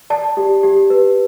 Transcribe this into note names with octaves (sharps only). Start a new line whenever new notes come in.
D5 A5
G4
G4
B4